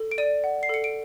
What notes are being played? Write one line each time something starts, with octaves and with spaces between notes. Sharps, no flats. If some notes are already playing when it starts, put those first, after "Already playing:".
Already playing: A4
D7
D5 D#7
F#5
C7
A4 C#7
D7